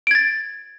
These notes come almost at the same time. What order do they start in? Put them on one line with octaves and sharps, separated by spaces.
D7 G#6 A6